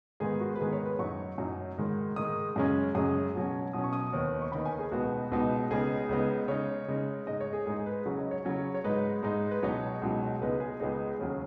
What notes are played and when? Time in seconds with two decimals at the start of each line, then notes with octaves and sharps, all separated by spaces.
0.20 G#2 D#3 B3 G#4
0.40 F#4
0.55 B4
0.60 G#2 D#3 B3 G#4
0.73 C#5
0.86 B4
0.99 F#2 F#3 D#4 C#6
1.38 F#2 F#3 D#4
1.78 G#2 D#3 G#3
2.16 G#2 D#3 G#3 D#6
2.56 F#2 C#3 G#3 C#4
2.95 F#2 C#3 G#3 C#4 D#6
3.35 B2 F#3 C#4
3.73 B2 F#3 C#4 D#6
3.84 C#6
3.93 D#6
4.13 D#2 D#3 B3 D#4
4.42 C#6
4.52 D#2 D#3 B3 D#4 B5
4.66 G#5
4.79 G#4
4.92 C#2 B2 B3 D#4 F#4
5.32 C#2 B2 B3 D#4
5.70 C#2 C#3 B3 D#4 G#4
6.09 C#2 C#3 B3 D#4
6.48 C#3 G#3 D#4 C#5
6.88 C#3 G#3 D#4
7.27 G#2 G#3 D#4 D#5
7.40 C#5
7.53 G#4
7.66 G#2 G#3 D#4 G#4
7.77 G#4
7.86 B4
8.05 C#3 F#3 C#4 C#5
8.19 D#5
8.31 C#5
8.45 C#3 F#3 C#4
8.75 C#5
8.84 G#2 G#3 D#4 B4
9.23 G#2 G#3 D#4
9.51 B4
9.62 C#2 B2 F#3 D#4 C#5
10.02 C#2 B2 F#3 D#4
10.41 C#2 C#3 G#3 B3 D#4 B4
10.60 G#4
10.80 C#2 C#3 G#3 B3 D#4 G#4
11.19 D#2 C#3 F#3 C#4